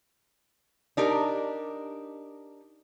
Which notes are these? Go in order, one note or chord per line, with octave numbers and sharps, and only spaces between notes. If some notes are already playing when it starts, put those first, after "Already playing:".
D4 D#4 G4 A#4